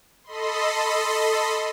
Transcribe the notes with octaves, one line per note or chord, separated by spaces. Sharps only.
A4 D#5 B5 C6